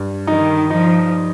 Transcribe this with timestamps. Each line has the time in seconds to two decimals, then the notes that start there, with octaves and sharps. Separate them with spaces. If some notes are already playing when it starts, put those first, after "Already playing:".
Already playing: G2
0.27 D#3 D#4
0.70 F3 D#4